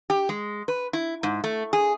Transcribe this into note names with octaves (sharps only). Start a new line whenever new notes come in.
G4
G#3
B4
E4
G#2
A3
G#4